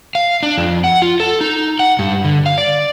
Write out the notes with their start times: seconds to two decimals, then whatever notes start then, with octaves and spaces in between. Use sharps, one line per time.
0.15 F5
0.43 D4
0.58 F2
0.84 F#5
1.02 F4
1.20 A4
1.41 D#4
1.79 F#5
1.99 G2
2.25 D3
2.46 F5
2.58 D5